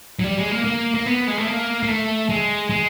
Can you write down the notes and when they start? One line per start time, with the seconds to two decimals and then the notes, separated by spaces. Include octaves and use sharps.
0.20 F#3
0.24 G3
0.38 G#3
0.51 A#3
0.65 A#3
0.94 A#3
1.06 B3
1.28 G#3
1.38 A3
1.47 A#3
1.83 A#3
1.88 A3
2.29 G#3
2.70 G#3